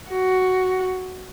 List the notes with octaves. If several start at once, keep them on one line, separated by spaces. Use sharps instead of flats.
F#4